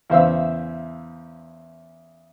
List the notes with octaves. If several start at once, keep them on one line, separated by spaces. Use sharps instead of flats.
E2 C#3 C5 E5 F5 E6